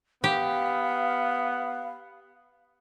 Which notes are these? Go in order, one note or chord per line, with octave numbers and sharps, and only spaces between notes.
B3 G4 F5